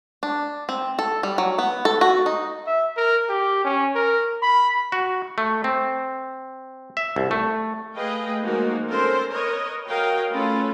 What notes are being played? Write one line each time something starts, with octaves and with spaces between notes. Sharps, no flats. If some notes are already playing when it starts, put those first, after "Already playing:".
D4
C4
A4
G3
F#3
B3
A4
F#4
D#4
E5
A#4
G4
C#4
A#4
B5
F#4
A3
C4
E5
C2
A3
A3 G#4 B4 D#5 F5 G5
F3 G#3 A#3 D#4 F#4 A#4
C4 C#4 A4 A#4 C5
A#4 B4 C#5 D#5
F#4 A#4 C#5 D#5 F5 G5
A3 C#4 F4 A4 B4 B5